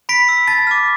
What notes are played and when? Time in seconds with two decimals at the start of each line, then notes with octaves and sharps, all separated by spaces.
0.09 B5 B6 D7
0.29 E6
0.48 A5 A6
0.67 D6 F6